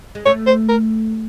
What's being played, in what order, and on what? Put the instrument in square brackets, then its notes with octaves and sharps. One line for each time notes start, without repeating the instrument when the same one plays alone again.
[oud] G#3
[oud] A3 [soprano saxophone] C#5
[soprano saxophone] C5
A#4